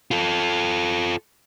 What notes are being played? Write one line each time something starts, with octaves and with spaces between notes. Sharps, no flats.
F4 A4